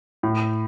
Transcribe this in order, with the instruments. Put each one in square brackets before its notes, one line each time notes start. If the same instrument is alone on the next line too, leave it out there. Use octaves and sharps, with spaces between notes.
[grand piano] A2